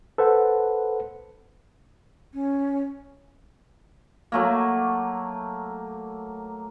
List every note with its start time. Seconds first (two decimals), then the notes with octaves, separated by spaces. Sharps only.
0.18 A4 B4 C5 F#5
2.34 C#4
4.32 F#3 A3 A#3